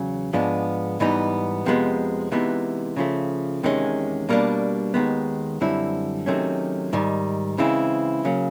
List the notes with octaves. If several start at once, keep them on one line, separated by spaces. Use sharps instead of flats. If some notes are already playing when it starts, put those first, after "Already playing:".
Already playing: E2 C#3 F#3
G#2 F3 G#3 B3 D4
G#2 E3 G3 B3 D#4
F2 C3 F3 G#3 B3
C3 E3 G#3 B3 D#4
C#3 F3 A3
E2 C3 D#3 G#3 C#4
B2 G3 A#3 D4
D#2 D#3 G#3 B3
F#2 D3 G3 C4 E4
C3 D#3 F#3 A3 C#4
G#2 D#3 G3
C#3 E3 G#3 C4 E4
C#3 F#3 A#3